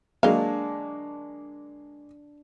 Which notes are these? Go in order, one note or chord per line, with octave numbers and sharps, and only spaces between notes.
F#3 G#3 A#3 D4 D#5 F5